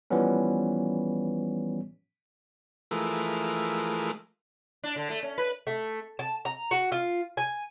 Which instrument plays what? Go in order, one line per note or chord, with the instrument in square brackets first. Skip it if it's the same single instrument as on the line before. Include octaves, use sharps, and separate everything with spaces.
[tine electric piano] E3 F3 G3 B3 C#4
[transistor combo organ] E3 F3 G#3 A3 A#4
[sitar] D4
D3
A3
C#4
B4
[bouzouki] A3
A5
A#5
F#4
F4
G#5